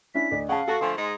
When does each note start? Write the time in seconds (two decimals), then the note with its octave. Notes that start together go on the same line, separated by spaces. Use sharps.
0.15 C#4 D4 E4 B6
0.31 D2 D5 D#5
0.49 C#3 F5 F#5 A5
0.68 A3 F#4 A4 A5
0.81 D3 F3 A3 G#5 C6
0.97 G#2 G#3 D#4